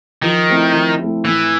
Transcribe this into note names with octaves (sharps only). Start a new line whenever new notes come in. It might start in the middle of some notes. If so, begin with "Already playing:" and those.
D#3 F3
A3 C4 E4
F3
A3 C4 E4
A2 E3